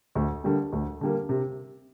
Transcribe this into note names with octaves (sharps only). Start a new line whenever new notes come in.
D2
D3 G3 A#3
D2
D3 G3 A#3
C3